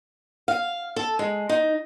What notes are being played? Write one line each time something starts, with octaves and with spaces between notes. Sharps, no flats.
F5
A4
G#3
D#4